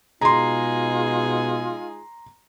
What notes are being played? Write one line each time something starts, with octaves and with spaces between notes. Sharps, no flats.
B2 G#3 D#4 F4 G#4 A#5 C6